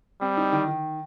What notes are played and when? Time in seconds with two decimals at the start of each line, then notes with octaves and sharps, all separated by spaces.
0.21 G3 C4
0.37 D#4
0.52 D#3
0.68 D#3